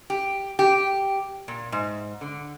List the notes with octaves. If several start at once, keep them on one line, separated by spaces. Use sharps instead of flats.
G4
G4
A#2
G#2
D3